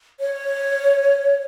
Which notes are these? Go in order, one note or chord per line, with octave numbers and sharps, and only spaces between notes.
C#5